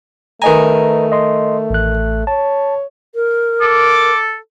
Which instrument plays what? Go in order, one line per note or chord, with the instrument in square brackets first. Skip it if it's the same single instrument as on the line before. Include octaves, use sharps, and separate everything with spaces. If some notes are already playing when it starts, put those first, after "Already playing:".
[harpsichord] D#3 G#5 [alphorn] A3 [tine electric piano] B4 D#5 A#5
[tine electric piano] D#5 C6
A1 F#6
[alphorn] C#5 [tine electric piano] A5
[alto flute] A#4
[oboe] A4 [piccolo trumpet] D6